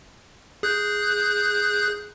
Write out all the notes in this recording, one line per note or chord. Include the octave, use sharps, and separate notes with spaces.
G#4 F#6 G6